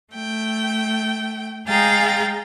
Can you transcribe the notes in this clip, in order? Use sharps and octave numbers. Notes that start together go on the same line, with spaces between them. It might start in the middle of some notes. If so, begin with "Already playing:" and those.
A3 G5
G#3 G#4 F5 G5 A#5 A6